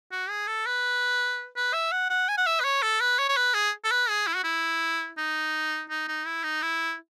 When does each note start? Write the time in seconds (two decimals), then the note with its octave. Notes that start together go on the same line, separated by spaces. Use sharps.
0.12 F#4
0.29 G#4
0.47 A4
0.66 B4
1.56 B4
1.73 E5
1.92 F#5
2.10 F#5
2.29 G#5
2.37 F#5
2.46 E5
2.60 B4
2.64 C#5
2.82 A4
3.01 B4
3.19 C#5
3.29 C#5
3.37 B4
3.54 G#4
3.84 A4
3.91 B4
4.09 G#4
4.27 E4
4.36 F#4
4.44 E4
5.18 D#4
5.90 D#4
6.08 D#4
6.26 E4
6.44 D#4
6.62 E4